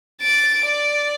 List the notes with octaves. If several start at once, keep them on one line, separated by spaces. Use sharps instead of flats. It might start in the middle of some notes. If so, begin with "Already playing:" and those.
A6 D7
D5